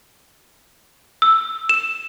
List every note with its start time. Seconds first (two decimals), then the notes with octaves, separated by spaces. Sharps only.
1.22 E6
1.69 E7